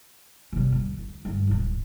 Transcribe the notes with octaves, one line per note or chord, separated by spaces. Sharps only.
C3 G3
D2
D2
G2 D3
D1 G#2